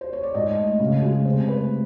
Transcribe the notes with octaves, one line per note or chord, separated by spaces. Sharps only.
C5
C#5
D5
G#2 D#5
A3
C#3
G#3
C3 C5
A3 B4